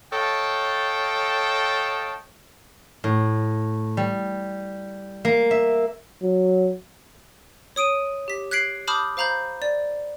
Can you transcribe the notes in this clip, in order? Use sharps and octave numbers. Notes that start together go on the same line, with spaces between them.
A4 C#5 D#5 F5 G5 A5
A2
G3
A#3
E5
F#3
C#5 D#6 D7 D#7
G4 B6
F#6 G#6 B6 C7 D7 F#7
A5 B5 D6 D#6 F6 G6
C5 F5 A#5 B5 G6
D5